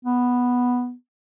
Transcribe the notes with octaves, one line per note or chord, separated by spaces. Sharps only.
B3